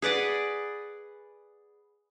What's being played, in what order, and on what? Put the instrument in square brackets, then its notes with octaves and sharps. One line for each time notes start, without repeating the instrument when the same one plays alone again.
[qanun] G#4 B4 D5 F#5